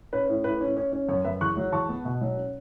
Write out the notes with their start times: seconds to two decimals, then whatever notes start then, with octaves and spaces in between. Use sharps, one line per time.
0.13 C#4 B4
0.29 A2
0.44 A2 B4
0.61 C#4
0.77 C#4
0.93 C#4
1.09 F#2 C#5
1.24 F#2 B4 E5
1.41 E2 C#6 F#6
1.57 F#3
1.72 E2 A5 C#6
1.89 B3
2.05 B2
2.21 F#3
2.37 C#4